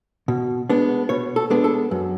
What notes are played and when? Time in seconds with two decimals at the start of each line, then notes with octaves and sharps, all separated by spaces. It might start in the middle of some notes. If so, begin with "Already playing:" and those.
0.28 B2
0.70 G#3 B3 D4
1.09 B2 C#5
1.36 A4
1.50 G#3 B3 D4
1.64 A4
1.91 F#2